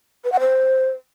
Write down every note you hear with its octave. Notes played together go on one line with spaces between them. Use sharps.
B4
F#5
C5